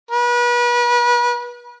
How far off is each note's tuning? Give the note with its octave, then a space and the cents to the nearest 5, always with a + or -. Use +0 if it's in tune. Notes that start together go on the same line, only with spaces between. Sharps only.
B4 -35